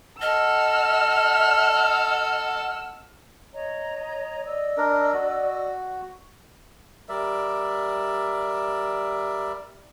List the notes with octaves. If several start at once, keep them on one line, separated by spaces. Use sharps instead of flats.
A4 D#5 F#5 E6 F6
C#5 D#5 A#5
D5 D#5 E6
D4 A#4
F#4
G3 A#4 D5 E5